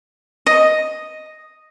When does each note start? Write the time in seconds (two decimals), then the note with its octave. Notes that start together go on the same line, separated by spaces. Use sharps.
0.47 D#5